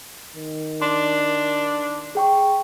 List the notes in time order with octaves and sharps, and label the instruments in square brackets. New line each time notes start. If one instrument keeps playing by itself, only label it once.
[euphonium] D#3
[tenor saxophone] D4 [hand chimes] C6
[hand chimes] G#4 G5 C#6